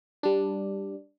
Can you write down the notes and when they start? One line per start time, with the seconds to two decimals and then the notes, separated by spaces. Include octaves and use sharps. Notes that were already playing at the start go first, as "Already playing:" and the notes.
0.23 G3 D4